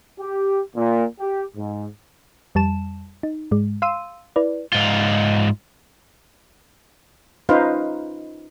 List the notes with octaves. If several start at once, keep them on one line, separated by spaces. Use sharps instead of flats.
G4
A#2
G4
G#2
F2 G3 A5 E7
D#4
G#2 G#3
F5 C6 E6 D#7
E4 B4 D5
G#2 F4
C#4 D#4 F4 B4 C5 F5